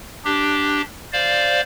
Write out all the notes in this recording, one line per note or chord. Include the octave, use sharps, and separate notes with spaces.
D4 G4
C5 D5 F5